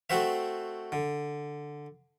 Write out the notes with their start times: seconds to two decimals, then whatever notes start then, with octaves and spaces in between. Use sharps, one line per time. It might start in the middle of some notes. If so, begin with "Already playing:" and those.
0.10 A3 C4 F#4 C5 E5
0.92 D3